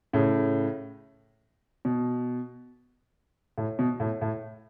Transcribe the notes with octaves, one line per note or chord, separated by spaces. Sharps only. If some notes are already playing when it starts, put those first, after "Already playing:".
A2 C#3
B2
A2
B2
A2
A2